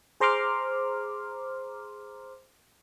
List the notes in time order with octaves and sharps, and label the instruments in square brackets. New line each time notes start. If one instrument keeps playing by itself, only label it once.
[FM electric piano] G#4 C5 A#5 C6 D6 F6